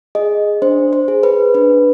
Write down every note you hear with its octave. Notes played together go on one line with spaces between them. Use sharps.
G#4 D#5
D4 C5
C5
G#4
B4
D4 B4